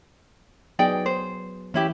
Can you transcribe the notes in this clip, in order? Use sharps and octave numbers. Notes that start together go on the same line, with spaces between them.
F#3 B3 D#4 G#4 D5 G5
C5
E3 C#4 E4 G4